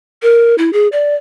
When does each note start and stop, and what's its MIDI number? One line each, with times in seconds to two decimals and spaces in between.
0.22 0.55 70
0.58 0.71 64
0.73 0.88 68
0.92 1.15 74